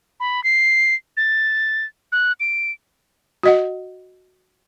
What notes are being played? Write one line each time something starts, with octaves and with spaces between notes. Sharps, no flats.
B5
C7
A6
F#6
D7
F#4 D#5 F#5